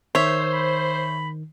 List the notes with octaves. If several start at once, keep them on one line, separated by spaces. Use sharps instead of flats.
D#3 C5 C#5 E5
B5